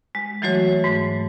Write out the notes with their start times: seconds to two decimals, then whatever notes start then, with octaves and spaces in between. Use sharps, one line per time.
0.15 G#3
0.42 E3 F#3 A3 F#4 C#5
0.84 G#2 A3